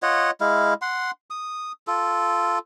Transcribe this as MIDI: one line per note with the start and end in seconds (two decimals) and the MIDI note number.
0.03 0.31 65
0.03 0.31 73
0.03 0.31 75
0.03 0.31 78
0.41 0.74 56
0.41 0.74 64
0.41 0.74 77
0.82 1.11 78
0.82 1.11 84
1.30 1.72 87
1.87 2.59 65
1.87 2.59 69